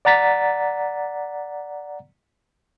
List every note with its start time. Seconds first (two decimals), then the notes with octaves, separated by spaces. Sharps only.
0.05 D5 F#5 A#5 A6 B6